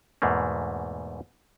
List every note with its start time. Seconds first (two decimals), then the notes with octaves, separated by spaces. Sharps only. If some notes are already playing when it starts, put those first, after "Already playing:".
0.22 E2 G#2 B2 A3 A#3